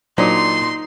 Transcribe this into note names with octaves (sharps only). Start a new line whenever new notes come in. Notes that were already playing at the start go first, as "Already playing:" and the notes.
A#2 F#3 D4 D#4 C5 C6